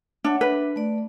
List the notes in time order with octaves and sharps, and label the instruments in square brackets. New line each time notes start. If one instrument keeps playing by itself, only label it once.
[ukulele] D4 [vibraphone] C#5 E5 F#5
[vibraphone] D4 E5 [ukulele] B4
[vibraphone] A3 D5